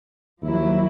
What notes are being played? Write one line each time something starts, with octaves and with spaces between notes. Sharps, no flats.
D#2 F3 F#3 E4